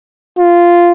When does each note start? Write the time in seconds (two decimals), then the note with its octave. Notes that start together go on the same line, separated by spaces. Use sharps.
0.38 F4